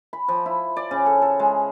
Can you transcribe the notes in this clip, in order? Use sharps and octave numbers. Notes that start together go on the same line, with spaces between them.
B5
F3
E4
D5
C#3
A4
A4
G#3